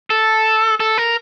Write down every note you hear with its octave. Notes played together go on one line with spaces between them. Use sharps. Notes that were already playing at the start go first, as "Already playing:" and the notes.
A4
A4
A#4